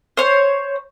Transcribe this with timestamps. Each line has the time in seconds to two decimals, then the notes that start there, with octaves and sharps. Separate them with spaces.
0.17 C5 C#5